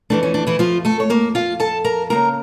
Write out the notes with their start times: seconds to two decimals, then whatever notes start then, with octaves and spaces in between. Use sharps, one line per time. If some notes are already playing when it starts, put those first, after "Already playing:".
0.10 F2 E3 A3 D4
0.23 C#4
0.34 D4
0.47 E3 E4
0.59 F3 F4
0.85 A3 A4
1.00 C#5
1.10 A#3 A#4
1.35 F4 F5
1.60 A4 A5
1.84 A#4 A#5
2.10 C#3 F3 A#3 A#4 A#5